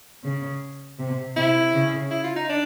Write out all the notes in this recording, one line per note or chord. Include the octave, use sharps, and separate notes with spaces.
C#3
C3
C3 E4
C#3
E4
F4
D#4
D4